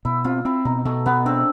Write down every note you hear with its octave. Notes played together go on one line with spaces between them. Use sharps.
B2 E4
C4 F4
C4 E4
B2 D#4
B2 A3
B2 B3
C4 D4